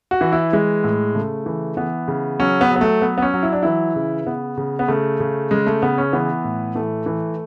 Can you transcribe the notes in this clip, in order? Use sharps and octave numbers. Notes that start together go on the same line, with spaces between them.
F#4
E3
E4
E3 G#3
A2
C#3 A3
E3
E3 B3
C#3
F#3 C#4
B3
F#3
B3
A3
F#3 B3
B3
C#4
F#3
E4
D4
E3 E4
C#3
C#3 B3
C#3
B3
C#3 A3
C#3
C#3 G#3
A3
C#3 B3
C#4
E3 B3
A2
E3 A3
E3